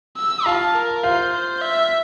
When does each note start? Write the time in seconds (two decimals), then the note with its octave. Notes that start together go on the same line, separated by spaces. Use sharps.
0.17 E6
0.46 F4 F5 A5
0.75 A#4
1.03 F4 C5 F5
1.33 C5
1.61 E5